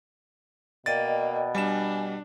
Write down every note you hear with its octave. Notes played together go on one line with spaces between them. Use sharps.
B2 A#3 D5 D#5 G5 A6
G3 D4 G#5 E7